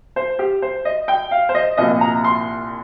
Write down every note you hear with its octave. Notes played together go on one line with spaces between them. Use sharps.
C5
G4
C5
D#5
G5
F5
C5
D#5
C2 A#2 F3 A#3 D#5
A#5
C6